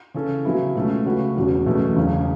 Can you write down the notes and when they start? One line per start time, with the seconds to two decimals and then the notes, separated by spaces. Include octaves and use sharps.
0.14 C#3 E3 C#4 A4
0.45 C#3 F#3 B3 E4
0.75 C#2 B2 A3 C#4 A4
1.06 C#3 A3 F#4 B4
1.36 E1 E2 B2 F#3 C#4
1.66 F#1 E2 B2 A3 C#4
1.97 E1 E2 C#3